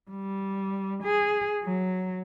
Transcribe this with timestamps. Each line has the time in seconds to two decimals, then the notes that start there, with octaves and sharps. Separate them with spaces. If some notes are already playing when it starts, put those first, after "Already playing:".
0.11 G3
1.04 G#4
1.64 F#3